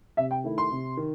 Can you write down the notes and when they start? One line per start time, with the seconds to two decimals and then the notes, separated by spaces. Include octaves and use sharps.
0.17 C3 E5
0.31 G5
0.44 D#3 A3 E4
0.58 C6
0.71 C3
0.97 D#3